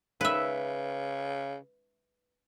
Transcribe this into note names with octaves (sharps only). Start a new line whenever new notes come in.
C#3 B4 E5